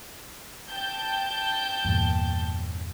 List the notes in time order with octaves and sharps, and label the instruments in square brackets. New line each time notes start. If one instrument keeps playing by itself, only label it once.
[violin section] G5 A5 G6
[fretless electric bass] E2 G2 A#2